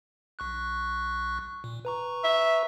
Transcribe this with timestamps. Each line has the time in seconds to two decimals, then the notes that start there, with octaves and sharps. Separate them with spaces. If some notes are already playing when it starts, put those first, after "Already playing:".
0.39 B1 C#6 F#6
1.64 A#2
1.85 B4 A#5 C#6
2.24 E5